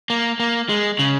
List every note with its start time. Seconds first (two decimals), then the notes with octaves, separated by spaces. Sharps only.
0.10 A#3
0.40 A#3
0.69 G#3
0.99 C#3